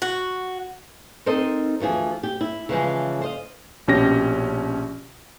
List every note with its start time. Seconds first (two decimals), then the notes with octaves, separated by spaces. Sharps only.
0.02 F#4
1.26 C4 D#4 A4 A#4 C5 D#5
1.80 D2 E3 F3 G#4
2.23 G4
2.41 E4
2.69 C#3 E3 F3 G#3
3.22 C5 D#5 F5
3.88 A#1 B2 C#4 G4 A#6